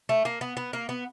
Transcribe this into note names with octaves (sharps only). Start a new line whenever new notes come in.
A3
A#3
B3
B3
A#3
B3